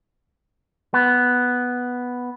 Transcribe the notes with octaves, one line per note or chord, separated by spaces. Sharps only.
B3